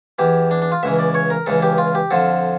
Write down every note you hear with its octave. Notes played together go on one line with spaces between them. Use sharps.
E2 E3 G4
D4
D4
F4
C#2 C#3 E3 E5
D5
C#5
A#4
C#2 C#3 E3 A4
G4
F4
G4
F2 D3 F3 A4